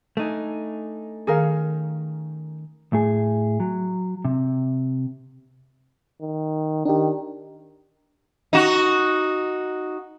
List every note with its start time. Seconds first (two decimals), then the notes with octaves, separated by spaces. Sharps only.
0.17 A3 D4 D#4 G#5
1.27 D#3 C#4 G#4 A#4 F5
2.93 A2 G#4
3.60 F#3
4.25 C3
6.21 D#3
6.85 D#3 D4 G4
8.53 D#4 F#4